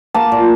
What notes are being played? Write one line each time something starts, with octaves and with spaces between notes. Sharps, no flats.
A#3 A5
A#2